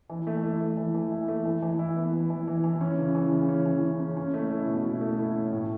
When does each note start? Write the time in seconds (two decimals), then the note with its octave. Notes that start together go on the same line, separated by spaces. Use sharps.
0.09 E3
0.27 A3
0.43 E4
0.60 A3
0.77 E3
0.94 E3
1.12 E4
1.28 A3
1.45 E3
1.62 E3
1.79 E4
1.96 B3
2.13 E3
2.30 E3
2.47 E3
2.64 E3
2.81 C#4
2.98 C#3
3.15 E3
3.32 C#3
3.49 C#4
3.66 E3
3.82 C#3
4.00 C#4
4.17 C#4
4.34 A3
4.50 E4
4.68 B2
4.84 E4
5.01 A3
5.18 E4
5.36 C#4
5.52 A2